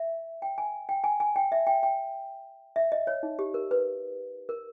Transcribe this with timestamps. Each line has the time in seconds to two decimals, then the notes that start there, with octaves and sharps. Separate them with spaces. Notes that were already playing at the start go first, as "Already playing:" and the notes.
Already playing: E5
0.42 G5
0.58 G#5
0.89 G5
1.04 G#5
1.20 G#5
1.36 G5
1.52 E5
1.67 G5
1.83 G5
2.76 E5
2.92 D#5
3.07 C#5
3.23 D#4
3.39 G4
3.54 A#4
3.71 B4
4.49 A#4